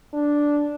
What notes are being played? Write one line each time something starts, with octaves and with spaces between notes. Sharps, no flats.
D4